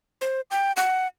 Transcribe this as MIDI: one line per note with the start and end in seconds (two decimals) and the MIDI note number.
0.21 0.41 72
0.51 0.72 79
0.77 1.07 78